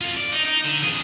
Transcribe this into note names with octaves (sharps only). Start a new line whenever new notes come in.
F4 A4
D5
D#4
D#4
D3
F2 G#4